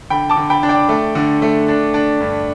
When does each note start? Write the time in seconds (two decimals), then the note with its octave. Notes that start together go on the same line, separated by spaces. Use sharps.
0.10 D3 G5 B5
0.29 A5 D6
0.36 D3
0.50 G5 B5
0.63 D4
0.69 D5 G5
0.89 A3
1.15 D3
1.42 A3
1.68 D4
1.94 D4
2.21 G2